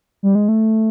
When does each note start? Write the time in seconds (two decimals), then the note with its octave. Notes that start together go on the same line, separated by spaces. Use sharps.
0.23 G3
0.35 G#3
0.48 A3